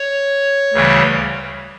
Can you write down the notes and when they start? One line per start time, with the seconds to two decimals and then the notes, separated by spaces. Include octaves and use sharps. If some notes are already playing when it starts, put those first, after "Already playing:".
Already playing: C#5
0.73 D2 C#3 E3 G3